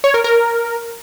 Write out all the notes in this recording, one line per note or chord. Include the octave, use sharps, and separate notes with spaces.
C#5
A#4
A#4